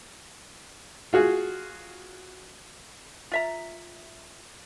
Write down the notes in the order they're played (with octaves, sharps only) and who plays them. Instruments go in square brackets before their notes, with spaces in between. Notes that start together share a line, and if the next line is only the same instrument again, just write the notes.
[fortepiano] F4 F#4 G#4
[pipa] F4 E5 A#5